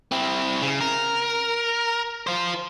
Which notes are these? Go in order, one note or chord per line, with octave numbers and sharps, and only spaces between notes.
C4 E4
C#3
A#4
F4 C5